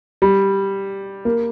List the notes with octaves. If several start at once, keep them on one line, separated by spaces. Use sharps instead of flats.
G3
A#3